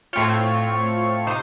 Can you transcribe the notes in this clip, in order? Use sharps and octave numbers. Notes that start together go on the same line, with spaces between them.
A2 A3 C4 F4 C#5
C3 D#4 C5